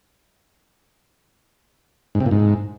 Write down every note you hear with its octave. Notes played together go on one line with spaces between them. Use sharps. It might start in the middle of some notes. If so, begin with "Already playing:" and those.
G#2
C3
A#2
G#2